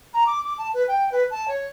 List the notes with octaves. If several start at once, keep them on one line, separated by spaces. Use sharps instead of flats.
A#5
D6
D6
A5
B4
G5
B4
A5
C#5